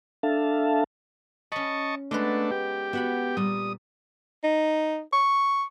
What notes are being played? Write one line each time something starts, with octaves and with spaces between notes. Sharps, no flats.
D4 A4 E5 F5 A5
C#4 D#5 A5 B5 C#6
G#3 A3 B3 D4 B4
G4
B3 F#4 E5 F#5 B5
A#2 G3 D#6
D#4
C#6